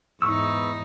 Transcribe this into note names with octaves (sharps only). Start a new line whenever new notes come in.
E2 G#2 B3 D#4 C#6 E6